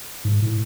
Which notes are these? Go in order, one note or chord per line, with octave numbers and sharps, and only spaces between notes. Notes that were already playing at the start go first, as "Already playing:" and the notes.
G#2
A2